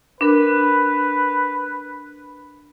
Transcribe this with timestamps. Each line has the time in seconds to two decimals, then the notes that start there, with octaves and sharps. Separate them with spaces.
0.21 D4 A#4 B4